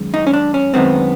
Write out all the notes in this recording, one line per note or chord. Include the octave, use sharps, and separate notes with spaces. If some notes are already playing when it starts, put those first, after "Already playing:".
Already playing: F#2 D#3 G#3
D#4
C#4
D4
C#4
F#2 D#3 G#3 B3 C4